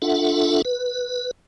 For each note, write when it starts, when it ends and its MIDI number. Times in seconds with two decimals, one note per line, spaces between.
0.02 0.62 62
0.02 0.62 65
0.02 0.62 69
0.02 0.62 76
0.02 0.62 78
0.65 1.31 71